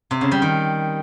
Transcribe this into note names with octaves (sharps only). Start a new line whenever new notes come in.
C3
C#3
G3
D#3